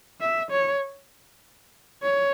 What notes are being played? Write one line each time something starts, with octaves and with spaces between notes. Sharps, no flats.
E5
C#5
C#5